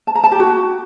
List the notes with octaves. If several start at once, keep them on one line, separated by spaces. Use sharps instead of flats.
A5
A#5
A5
G4
F#4